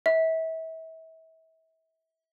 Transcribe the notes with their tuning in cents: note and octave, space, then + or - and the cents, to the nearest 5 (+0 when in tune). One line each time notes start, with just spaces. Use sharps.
E5 -35